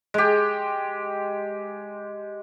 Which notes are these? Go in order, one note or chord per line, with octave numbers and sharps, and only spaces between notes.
G#3 G4